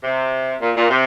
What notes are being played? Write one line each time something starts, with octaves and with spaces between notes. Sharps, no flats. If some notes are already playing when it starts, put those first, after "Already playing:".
C3
A#2
A#2
C3